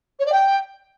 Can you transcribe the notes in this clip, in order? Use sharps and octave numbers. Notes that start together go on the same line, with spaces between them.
C#5
D5
G5